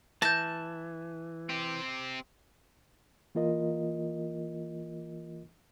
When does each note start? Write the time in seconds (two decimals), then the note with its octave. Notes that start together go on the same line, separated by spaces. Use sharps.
0.22 E3 A5 G6 A6 A#6
1.49 C4 G4
3.35 E3 A#3 F4 A#4 D#5